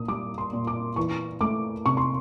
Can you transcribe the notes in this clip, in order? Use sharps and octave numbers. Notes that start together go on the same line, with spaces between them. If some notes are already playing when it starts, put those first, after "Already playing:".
Already playing: A#2 D#6
G3 D6
C6
A#2
D6
E3 C#6
A3 D6
C3 C#6
C6